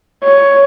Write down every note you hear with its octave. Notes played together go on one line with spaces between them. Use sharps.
C#5